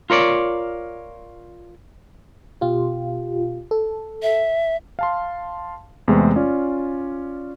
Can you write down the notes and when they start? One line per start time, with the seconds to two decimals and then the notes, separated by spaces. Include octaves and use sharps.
0.10 F4 A#4 C#5 D5
2.61 B2 F4 G4
3.71 A4
4.22 E5
4.99 F5 A5 C6
6.08 E2 C3 E3 G#3 A3 C4
6.36 C#4 F4 D5